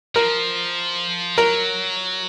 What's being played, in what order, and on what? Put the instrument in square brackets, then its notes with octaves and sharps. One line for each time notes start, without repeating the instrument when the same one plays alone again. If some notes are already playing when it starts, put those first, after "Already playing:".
[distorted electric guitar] F3 [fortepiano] A#4
[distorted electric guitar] F#3 [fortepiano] A#4